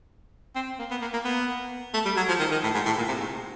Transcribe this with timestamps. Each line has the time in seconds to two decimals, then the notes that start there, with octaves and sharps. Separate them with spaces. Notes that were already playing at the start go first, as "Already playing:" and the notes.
0.56 C4
0.79 A#3
0.91 B3
1.01 A#3
1.14 A#3
1.24 B3
1.94 A3
2.05 G3
2.17 F#3
2.29 F3
2.40 D#3
2.51 D#3
2.63 A2
2.74 G#2
2.85 A2
2.98 A#2
3.08 C3
3.20 G#2